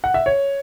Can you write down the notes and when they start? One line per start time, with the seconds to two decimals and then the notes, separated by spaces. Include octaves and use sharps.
0.04 F#5
0.14 E5
0.26 C#5